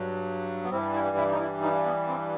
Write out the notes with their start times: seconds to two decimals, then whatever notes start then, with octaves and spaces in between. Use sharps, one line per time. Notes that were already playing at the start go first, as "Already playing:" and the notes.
Already playing: G2 F#3
0.64 B3
0.70 G2 E3 G3 C4
0.93 E4
1.17 E4
1.32 D#4
1.40 E4
1.62 D#4
1.85 B3
2.08 C4